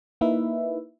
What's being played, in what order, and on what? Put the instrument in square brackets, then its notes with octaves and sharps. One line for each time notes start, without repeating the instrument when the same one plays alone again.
[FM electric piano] A#3 D#4 E4 B4 E5